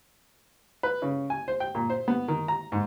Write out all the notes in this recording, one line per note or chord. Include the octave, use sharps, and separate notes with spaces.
B4
C#3
G#5
C5
G5
A#2
C5
B3
D#3
A#5
G#2